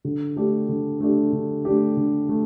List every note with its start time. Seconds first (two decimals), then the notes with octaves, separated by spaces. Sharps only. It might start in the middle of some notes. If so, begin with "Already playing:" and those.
0.05 D3
0.36 A3 D4 G4
0.69 D3
1.00 A3 D4 G4
1.33 D3
1.65 A3 D4 G4
1.97 D3
2.29 A3